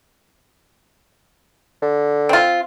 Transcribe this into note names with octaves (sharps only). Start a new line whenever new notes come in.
D3
C4 F4